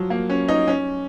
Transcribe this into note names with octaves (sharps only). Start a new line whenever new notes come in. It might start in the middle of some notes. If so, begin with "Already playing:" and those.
Already playing: F3 F#3
A#3
C#4
D#4
C#4